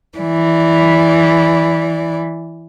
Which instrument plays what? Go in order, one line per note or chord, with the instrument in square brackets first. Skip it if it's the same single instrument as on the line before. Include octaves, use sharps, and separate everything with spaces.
[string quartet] E3 D5